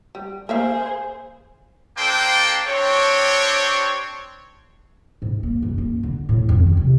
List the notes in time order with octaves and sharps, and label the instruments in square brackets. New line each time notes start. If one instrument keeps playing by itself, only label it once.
[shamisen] G3
[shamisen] A#3 E5 F5 [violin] G#4 C5
[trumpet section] A#3 D4 A4 C5 G5
C4 D4 G4 C#5
[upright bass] G#2
A#3
F#2
A#3
D3
A2
F2
D#3
C3